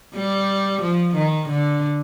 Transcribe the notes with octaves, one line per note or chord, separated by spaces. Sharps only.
G3
F3
D#3
D3